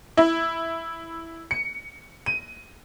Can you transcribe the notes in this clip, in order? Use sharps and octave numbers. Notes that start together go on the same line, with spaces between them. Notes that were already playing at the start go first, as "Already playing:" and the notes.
E4
C#7
D#7